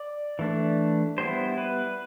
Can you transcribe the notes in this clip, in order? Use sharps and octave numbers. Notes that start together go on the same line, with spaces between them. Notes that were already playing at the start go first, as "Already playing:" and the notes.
Already playing: D5
E3 A3 D4
G3 B3 E4 C5
B4